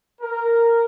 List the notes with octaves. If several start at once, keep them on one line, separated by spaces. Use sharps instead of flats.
A#4